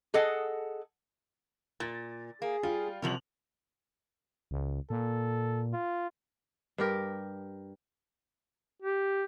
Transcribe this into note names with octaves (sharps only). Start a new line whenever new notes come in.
G#4 A4 D#5 F#5
A#2 A6
A#3 G#4
G3 F4
F#2 C3 F3 G3 A#4 F7 F#7
C#2
A#2 A4
F4
G2 G4 A#4
G4